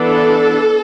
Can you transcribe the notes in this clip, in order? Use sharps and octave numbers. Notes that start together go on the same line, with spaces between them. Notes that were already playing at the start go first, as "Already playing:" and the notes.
Already playing: E3 B3 D4 A4